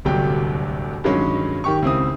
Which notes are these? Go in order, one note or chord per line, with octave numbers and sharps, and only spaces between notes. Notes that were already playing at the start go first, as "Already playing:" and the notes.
D1 G1 C2 F#3 G4 G5
G2 D#3 F#3 G#3 C#4
D#3 G4 C#6
C#2 C4 E4 D#6